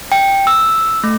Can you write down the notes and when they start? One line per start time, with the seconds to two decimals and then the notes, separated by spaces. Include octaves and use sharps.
0.12 G5
0.47 E6
1.04 A3